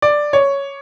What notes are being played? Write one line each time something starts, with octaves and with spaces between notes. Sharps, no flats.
D5
C#5